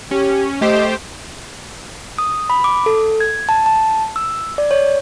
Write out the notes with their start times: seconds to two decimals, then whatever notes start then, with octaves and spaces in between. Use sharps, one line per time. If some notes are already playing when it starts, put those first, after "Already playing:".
0.11 C#4 G4
0.61 A3 G4 C5 D#5
2.18 D#6
2.50 B5
2.64 D6
2.86 A4
3.20 G#6
3.49 A5
3.66 A5
4.16 E6
4.58 D5
4.71 C#5